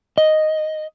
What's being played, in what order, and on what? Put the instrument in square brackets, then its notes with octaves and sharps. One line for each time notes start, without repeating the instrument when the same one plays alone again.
[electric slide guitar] D#5